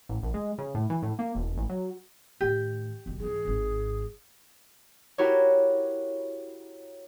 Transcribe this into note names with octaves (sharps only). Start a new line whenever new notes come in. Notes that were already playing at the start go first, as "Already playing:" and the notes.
A1
A#1
G#3
C#3
A2
E3
A2
A#3
E1
A1
F#3
A2 D#3 G4
E1 B1
G#2 E3 G#4
G#1 G#2
E4 F#4 G4 A#4 C#5